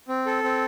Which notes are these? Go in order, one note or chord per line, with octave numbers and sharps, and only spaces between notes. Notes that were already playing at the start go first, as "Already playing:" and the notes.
C4
A4
C4